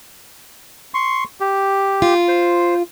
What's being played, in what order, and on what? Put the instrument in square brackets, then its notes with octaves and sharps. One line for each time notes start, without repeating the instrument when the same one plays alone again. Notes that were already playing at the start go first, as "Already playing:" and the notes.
[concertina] C6 C#6
G4
[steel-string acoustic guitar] F4
[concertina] C5